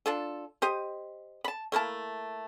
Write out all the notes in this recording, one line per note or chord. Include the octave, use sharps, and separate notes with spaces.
D4 F4 A4
G4 C5 D#5
A5 B5
A3 A#3 E4 A5